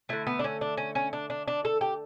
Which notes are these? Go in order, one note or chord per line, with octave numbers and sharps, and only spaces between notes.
D3 A3 E4
B3
D4
C#4
D4
C#4
C#4
D4
D4
D4
A4
G4